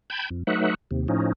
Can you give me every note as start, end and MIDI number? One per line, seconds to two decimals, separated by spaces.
0.10 0.29 79
0.10 0.29 81
0.10 0.29 83
0.10 0.29 91
0.10 0.29 92
0.30 0.43 41
0.47 0.74 54
0.47 0.74 57
0.47 0.74 63
0.47 0.74 71
0.47 0.74 76
0.47 0.74 78
0.91 1.07 39
0.91 1.07 48
1.08 1.33 45
1.08 1.33 53
1.08 1.33 61
1.08 1.33 63